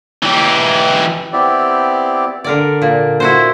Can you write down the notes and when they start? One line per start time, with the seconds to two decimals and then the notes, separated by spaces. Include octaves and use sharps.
0.23 E3 G4
1.33 B3 C4 E4 G4 D5
2.44 D3 A#4 D5
2.82 A#2
3.20 E4 F#4 C5